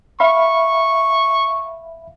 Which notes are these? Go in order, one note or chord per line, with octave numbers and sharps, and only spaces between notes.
E5 F5 B5 C#6